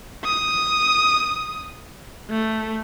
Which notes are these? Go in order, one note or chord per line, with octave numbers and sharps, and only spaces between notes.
D#6
A3